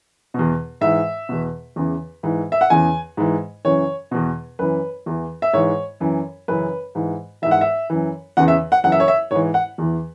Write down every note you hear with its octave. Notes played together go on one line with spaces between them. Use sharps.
E2 B2
G#2 E3 E5
E2 B2
E2 C#3 E3
G#2 E3
E5
F#5
E2 C#3 E3 G#5
G#2 E3
F#2 C#3 E3 C#5
E2 B2
F#2 E3 B4
E2 E3
E5
G#2 E3 C#5
F#2 E3
F#2 C#3 E3 B4
G#2 E3
G#2 E3 E5
F#5
E5
F#2 E3
E2 C#3 E3 F#5
E5
F#5
F#2 C#3 E3 F#5
E5
C#5
E5
G#2 E3 C#5
F#5
E2 E3